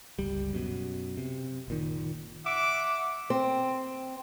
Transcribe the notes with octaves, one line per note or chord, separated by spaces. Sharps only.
G1 C#2 G3
F#2 B2
C3
F#1 A#2 D#3
E5 F#5 D6
C4